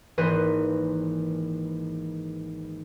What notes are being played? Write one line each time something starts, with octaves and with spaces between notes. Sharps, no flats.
G#1 E3 A#3 B4 C5 D#5